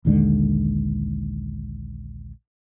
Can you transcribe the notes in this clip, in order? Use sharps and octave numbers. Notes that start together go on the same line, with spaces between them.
A#1 D#2 D3 G#3